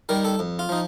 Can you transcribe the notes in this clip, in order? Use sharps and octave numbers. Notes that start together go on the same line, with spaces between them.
D#3 G3 A#4
A4
F2
F4
F3 D#4